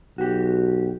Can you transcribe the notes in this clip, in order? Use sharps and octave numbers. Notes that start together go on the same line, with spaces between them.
B1 F#4 G4